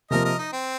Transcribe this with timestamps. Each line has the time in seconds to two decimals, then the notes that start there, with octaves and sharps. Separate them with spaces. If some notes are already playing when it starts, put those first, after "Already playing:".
0.11 C3 F3 A#3 A#4 D#5
0.25 A#4 D#5
0.39 D#4
0.53 C4